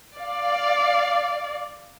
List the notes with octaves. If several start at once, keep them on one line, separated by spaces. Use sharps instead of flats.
D5 F5